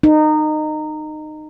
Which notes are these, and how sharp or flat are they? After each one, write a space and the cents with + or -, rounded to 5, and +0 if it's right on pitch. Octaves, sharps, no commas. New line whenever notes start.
D#4 -20